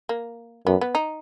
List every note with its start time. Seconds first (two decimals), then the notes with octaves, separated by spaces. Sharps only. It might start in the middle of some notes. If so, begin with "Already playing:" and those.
0.09 A#3
0.67 F#2 B3
0.81 B3
0.95 D#4